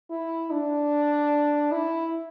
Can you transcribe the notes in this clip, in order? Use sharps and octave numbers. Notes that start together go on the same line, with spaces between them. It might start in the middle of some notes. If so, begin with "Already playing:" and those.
E4
D4
E4